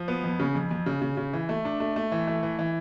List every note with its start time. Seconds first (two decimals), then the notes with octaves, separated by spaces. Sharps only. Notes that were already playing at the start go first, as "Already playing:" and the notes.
Already playing: F3
0.08 B3
0.24 F2
0.40 C#3
0.55 F2
0.71 F2
0.86 C#3
1.02 C#3
1.17 C#3
1.33 E3
1.49 A3
1.65 D4
1.80 A3
1.96 A3
2.12 E3
2.27 A3
2.43 E3
2.59 E3